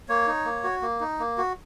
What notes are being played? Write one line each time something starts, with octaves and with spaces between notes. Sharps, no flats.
A#3 C#5
D#4
A#3
F#4
A#3
D#4
A#3
F#4